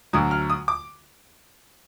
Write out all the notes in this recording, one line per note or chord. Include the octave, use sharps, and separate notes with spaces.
D2 D3 F#3 D#6
F6
D#6
D6